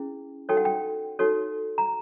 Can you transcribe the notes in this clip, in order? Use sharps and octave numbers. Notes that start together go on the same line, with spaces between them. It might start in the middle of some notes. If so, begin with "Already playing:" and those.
Already playing: C#4 E4 G#4
D#4 F#4 A4 C#5 G5
F#5
G5
D#4 F#4 A4 C#5
A#5